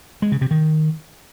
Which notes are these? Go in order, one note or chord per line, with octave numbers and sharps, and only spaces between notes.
G#3
C#3
C3
D#3